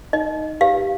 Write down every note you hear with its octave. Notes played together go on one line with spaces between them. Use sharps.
D#4 D#5
G4 B4 F5